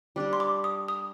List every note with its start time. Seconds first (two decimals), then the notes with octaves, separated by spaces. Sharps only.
0.16 G3 D4 G4
0.33 C6
0.40 D6
0.64 D#6
0.88 D#6